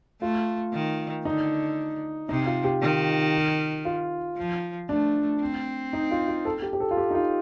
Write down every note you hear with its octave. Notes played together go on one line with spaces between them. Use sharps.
A3 F4
D#3
D3 D#4
C3 D#4
F4
G4
D#3
F4
F3
A3 D4
C4
D#4
F4
F4
A4
G4
G4
A4
F4
G4
D#4
F4